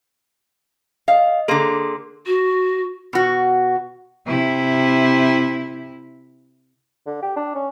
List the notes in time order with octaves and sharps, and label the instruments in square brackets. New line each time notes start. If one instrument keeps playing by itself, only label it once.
[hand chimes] D#5 [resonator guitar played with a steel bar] F5
[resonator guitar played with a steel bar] D3 A#3 [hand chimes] G#4 A4 C6
[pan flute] F#4
[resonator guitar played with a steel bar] B2 F#4
[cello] C3 E4
[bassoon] D3
G4
D4
C#4